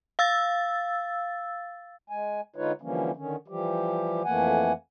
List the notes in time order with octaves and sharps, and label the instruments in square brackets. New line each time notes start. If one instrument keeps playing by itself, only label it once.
[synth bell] F5 E6 A6
[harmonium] G#3 G#5
D3 G#3 D#4 F4 B4 C#5
D3 E3 F3 G3 A#3 C#4
D3 D#3 C#4
E3 F3 G3 G4
F2 E3 A3 A#3 F#5 G#5